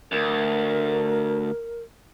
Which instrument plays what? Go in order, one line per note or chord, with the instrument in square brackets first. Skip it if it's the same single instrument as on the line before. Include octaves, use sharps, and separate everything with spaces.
[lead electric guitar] D2 [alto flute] A#4